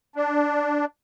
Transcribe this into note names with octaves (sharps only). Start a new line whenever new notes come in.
D4